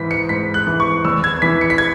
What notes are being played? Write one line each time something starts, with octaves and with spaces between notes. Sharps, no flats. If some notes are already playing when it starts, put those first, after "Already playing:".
Already playing: G#2 E3 B6
C#7
G#2 B6
F#6
E3
C#6
E2 E6
G#6
E3 B6
C#7
B6
G#6